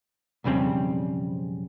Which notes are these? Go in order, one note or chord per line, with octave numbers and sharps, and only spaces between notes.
B1 F2 C#3 G3 C4